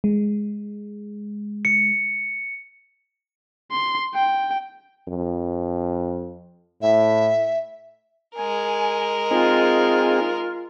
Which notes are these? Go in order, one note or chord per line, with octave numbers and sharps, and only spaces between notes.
G#3
C#7
C6
G5
F2
A2 E5
G#3 A#4 G#5
C4 D#4 F4 G#4